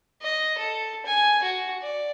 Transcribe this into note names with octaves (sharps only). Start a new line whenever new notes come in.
D#5
A4
G#5
F#4
D5